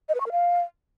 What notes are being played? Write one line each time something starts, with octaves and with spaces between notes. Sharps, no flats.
D#5
B4
C#6
A#4
F5